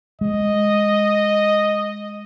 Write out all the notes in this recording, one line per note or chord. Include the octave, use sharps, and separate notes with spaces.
G#3 D#5